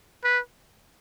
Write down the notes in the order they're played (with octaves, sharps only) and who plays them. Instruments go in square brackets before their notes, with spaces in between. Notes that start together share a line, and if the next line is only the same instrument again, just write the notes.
[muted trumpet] B4